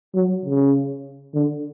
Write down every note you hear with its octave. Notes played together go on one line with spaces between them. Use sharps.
F#3
C#3
D3